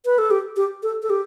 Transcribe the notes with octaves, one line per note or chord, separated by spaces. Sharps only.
B4
A4
G4
G4
A4
A4
G4